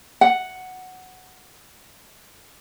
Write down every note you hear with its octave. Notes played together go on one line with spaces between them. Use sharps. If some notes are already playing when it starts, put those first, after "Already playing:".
F#5